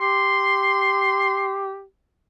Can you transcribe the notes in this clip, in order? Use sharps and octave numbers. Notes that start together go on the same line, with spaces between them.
G4 C6